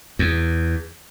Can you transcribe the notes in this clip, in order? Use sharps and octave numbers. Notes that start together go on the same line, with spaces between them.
E2